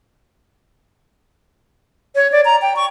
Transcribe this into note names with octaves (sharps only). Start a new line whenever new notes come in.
C#5
D5
A#5
G5
C#6